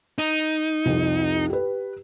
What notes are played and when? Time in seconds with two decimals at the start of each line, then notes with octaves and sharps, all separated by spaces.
0.18 D#4
0.85 C2 F2
1.50 G4 B4